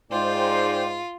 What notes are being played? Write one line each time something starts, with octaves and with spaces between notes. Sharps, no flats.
G#2 F4 C5 D5 G5